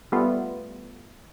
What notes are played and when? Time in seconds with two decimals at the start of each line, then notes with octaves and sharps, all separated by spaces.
0.12 G3 A3 B3 F4